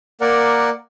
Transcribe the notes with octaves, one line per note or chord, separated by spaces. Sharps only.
A#3 A#4 D5 F#5